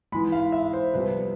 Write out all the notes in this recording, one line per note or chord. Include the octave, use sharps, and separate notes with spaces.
G#2 E3 G#3 B5
F5
E5
C5
C2 C3 F3 B3 B4